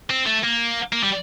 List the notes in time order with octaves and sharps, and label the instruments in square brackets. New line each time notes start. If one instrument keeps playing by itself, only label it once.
[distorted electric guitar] C4
A3
A#3
A#3
G3